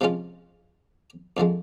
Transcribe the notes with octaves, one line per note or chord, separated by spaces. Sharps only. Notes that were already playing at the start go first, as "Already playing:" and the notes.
C3 F3 G#3 C#4 F4
F2 D3 F3 G#3